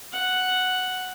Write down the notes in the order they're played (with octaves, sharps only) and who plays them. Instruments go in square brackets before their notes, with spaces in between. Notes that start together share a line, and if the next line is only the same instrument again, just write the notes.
[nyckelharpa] F#5